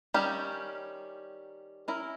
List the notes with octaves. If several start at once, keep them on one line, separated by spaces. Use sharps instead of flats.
D#3 G3 C#4 G4
C#4 E4 A#4